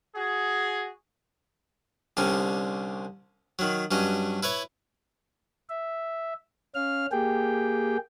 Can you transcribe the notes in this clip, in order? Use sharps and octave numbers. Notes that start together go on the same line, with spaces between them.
F#4 G#4
C2 D3 C4 C#4
D#3 F#3
G2 F#3 C#4 D#5
E4 B4 C#5
E5
C#4 F5 F6
A#3 G4 G#4 G5